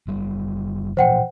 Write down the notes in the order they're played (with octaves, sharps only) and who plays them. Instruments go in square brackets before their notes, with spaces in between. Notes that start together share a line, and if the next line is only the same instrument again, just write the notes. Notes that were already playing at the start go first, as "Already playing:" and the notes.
[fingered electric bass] F#1 G3
[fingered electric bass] A#2 E3 F3 [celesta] C5 F#5 G5